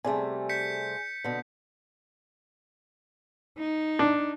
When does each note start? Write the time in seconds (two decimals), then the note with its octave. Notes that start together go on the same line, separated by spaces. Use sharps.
0.05 C3 G3 A3 G#4 D5 G#5
0.49 G6 B6 C#7
1.24 B2 D3
3.58 D#4
3.99 D4